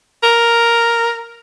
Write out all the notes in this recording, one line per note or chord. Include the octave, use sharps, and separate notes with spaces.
A#4